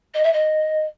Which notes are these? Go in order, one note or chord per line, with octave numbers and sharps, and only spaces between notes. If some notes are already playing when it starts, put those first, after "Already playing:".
D#5
E5
D#5